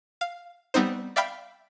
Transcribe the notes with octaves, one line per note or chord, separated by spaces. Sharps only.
F5
G3 B3 C4 D#4 C5
D5 E5 F5 G5 B5